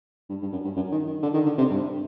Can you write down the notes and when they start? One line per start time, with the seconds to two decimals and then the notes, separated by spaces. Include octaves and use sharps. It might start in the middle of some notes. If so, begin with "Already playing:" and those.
0.30 G2
0.42 G2
0.52 F#2
0.65 G2
0.76 F#2
0.92 D#3
1.07 D#3
1.23 D3
1.34 D#3
1.46 D3
1.58 C3
1.70 G2